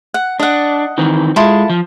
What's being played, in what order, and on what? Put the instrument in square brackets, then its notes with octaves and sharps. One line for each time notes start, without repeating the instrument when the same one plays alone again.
[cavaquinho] F#5
[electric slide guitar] D4 [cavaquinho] D#5 F#5
[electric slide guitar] D#3 E3 C4
[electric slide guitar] G#3 [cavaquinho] E4 F4 A4
[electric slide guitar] F3